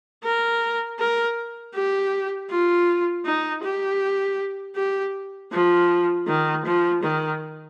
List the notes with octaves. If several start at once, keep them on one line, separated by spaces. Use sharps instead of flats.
A#4
A#4
G4
F4
D#4
G4
G4
F3
D#3
F3
D#3